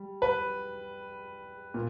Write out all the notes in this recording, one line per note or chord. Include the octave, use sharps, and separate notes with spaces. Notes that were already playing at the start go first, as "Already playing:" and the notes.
Already playing: G3
B4
A#2